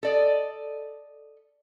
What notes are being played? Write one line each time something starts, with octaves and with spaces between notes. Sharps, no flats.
A4 D5 D#5